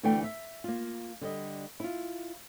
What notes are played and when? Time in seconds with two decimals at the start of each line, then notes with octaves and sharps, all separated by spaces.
0.03 D2 E3 A3 D4 A4 G5
0.24 E5
0.64 A#3 F4
1.21 D3 G3 D#5
1.80 E4 F4